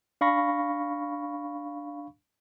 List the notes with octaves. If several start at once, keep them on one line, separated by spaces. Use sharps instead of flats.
D4 F5 B5 C#6 A#6